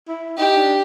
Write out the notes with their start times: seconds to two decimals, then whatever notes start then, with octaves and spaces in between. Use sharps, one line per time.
0.08 E4
0.38 D#4 G4
0.57 D4